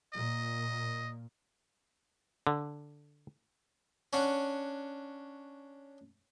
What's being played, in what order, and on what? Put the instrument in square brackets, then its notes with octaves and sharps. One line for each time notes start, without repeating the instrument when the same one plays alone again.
[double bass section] A#2 [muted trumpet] D#5
[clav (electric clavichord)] D3
[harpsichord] C#4 D4 F#5